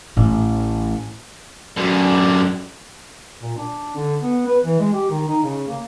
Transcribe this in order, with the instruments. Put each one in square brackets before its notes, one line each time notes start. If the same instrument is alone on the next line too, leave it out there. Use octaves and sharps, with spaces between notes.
[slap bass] A1 [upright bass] A2 E3
[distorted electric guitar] F#2 D3
[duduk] A#2
D4
D3
B3
B4
E3
G#3
G4
D#3
D#4
C#3
A#3